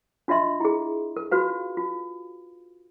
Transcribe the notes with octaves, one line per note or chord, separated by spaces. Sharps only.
D4 F4 D#5 E5 C6
E4 G#4
A#4
F4 F#4 B4 F5
F4